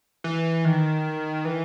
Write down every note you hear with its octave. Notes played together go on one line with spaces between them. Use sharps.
E3
D#3
E3